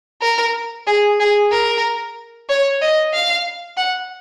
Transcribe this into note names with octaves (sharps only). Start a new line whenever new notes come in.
A#4
G#4
G#4
A#4
C#5
D#5
F5
F#5